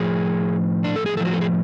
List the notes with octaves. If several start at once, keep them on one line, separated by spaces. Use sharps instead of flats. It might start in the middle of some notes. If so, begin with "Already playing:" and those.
Already playing: A2 F3 G#4
D4
A4
G#4
A2 F3 F#4 A4
A4
G#4